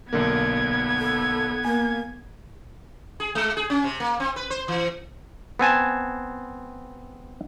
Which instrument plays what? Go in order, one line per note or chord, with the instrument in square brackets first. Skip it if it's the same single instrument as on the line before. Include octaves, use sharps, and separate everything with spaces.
[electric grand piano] B1 D3 A#3 [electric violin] B3 G#6
[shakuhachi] A4
[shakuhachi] A#3 [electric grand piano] G#5
[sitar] G#4
G#3
G#4
C#4
C3
A#3
C4
B4
C5
E3
[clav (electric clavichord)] B3 C4 G#5 A5